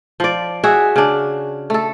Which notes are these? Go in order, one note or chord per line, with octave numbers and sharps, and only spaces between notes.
F3 D5
F#4 G#4 E5
C#3 D4
A3 A4